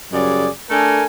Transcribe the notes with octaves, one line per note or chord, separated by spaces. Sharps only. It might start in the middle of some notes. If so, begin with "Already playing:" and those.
F#2 C#3 G3 G#4 D5
A3 D4 A4 A#4 G#5